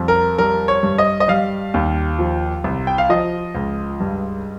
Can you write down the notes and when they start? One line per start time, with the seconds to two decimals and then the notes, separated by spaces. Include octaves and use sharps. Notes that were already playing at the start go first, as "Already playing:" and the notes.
Already playing: F2 G3
0.08 A#4
0.38 G3 A#4
0.68 C#5
0.83 G2
0.98 D#5
1.20 D#5
1.28 G3 F5
1.74 D#2
2.19 F3
2.64 C2
2.87 G5
2.98 F5
3.09 F3 D#5
3.55 C#2
4.00 G2